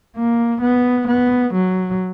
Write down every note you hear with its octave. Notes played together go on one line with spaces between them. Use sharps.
A#3
B3
B3
F#3